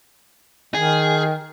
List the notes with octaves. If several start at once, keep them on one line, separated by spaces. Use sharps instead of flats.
D#3 G#4